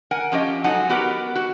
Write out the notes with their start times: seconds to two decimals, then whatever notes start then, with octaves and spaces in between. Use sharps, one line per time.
0.11 A#4 F#5 G#5
0.32 F3 C#4 G4 D#5
0.64 G#2 F#3 D#4 A4 F#5 G#5
0.89 B3 F#4 G4 A#4 B4
1.35 F#4